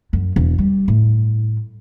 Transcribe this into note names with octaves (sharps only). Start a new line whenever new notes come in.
F#2
E1
G3
A2